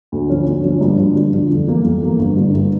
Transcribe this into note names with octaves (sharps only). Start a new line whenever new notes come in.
D2
D3 F3 C#4
D2
D3 F3 C#4
G2
D3 F3
G2
D3 F3
F2
E3 A#3
F2
E3 A#3
G1
G2 D3 A3
G1